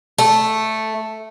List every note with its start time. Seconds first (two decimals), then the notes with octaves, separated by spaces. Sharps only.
0.18 A3